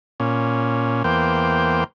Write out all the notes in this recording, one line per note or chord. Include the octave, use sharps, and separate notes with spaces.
A#2 C#4
E2 A#3 C5 G5